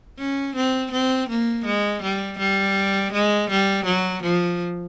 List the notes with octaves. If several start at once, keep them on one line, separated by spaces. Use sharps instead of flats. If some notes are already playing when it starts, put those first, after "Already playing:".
C#4
C4
C4
A#3
G#3
G3
G3
G#3
G3
F#3
F3